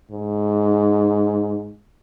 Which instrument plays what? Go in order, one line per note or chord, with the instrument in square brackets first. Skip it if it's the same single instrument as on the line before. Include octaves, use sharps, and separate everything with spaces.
[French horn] G#2